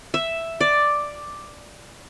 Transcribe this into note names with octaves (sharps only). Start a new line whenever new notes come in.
E5
D5